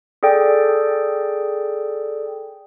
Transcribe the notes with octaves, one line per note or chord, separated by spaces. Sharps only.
G#4 A4 D5 G5